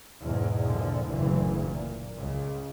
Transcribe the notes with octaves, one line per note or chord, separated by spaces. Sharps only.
E2 G#2 B2
A#1 A#2 D3 F3
F#1 D2 A#2 E3
A#2
C#2 C#3